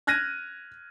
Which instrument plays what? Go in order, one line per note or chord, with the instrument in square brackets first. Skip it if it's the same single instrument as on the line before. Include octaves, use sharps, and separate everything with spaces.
[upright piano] F6 F#6 G#6 A#6 D#7